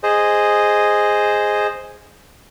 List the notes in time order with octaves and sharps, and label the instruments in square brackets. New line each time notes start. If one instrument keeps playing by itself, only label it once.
[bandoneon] G#4 C5 D#5